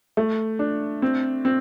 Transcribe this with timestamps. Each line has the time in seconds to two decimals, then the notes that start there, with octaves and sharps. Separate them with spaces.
0.17 A3
0.59 D4
1.02 C4
1.45 C4